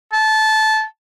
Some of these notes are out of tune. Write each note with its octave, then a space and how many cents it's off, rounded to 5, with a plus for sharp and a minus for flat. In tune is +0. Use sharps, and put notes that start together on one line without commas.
A5 -15